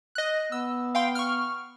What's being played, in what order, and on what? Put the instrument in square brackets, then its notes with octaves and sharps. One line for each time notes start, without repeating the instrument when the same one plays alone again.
[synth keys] D#5 F#6
[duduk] B3 [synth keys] E6
[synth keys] F5 G5 C6
C#6 F6